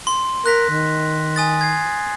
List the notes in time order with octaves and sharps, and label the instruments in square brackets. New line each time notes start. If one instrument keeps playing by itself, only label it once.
[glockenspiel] C6
[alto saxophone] A#4 [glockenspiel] F#6 A#6 B6
[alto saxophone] D#3
[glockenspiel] G#5 D#6 A6
G#6 C7